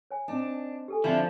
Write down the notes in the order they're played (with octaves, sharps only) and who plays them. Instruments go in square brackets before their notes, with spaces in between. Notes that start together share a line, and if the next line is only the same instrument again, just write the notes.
[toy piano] C#5 G#5
[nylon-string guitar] C4 D#4 [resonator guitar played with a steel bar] D4
[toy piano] G4 A4 G#5
[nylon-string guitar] D3 C4 [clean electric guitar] F3 F4 [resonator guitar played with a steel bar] D4 E4